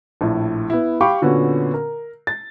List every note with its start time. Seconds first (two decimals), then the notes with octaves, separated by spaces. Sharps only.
0.21 A#1 A2
0.70 B3 E4
1.01 G4 F5 G5 B5 C#6 D6
1.22 A#2 D3 B3 C#4 F#4
1.74 A#4
2.27 A6